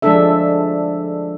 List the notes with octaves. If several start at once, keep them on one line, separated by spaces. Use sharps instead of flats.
F3 G#3 A3 D4 A4 E5